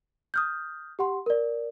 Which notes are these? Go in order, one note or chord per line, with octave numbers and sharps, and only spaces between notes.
D#6 F6 G6
G4 F#5 C6
A#4 D5